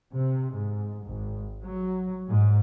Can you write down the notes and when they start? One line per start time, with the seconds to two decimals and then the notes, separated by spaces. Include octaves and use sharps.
0.14 C3
0.53 G#2
1.06 G#1
1.64 F#3
2.28 G#2